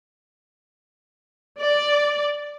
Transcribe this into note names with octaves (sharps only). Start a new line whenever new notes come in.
D5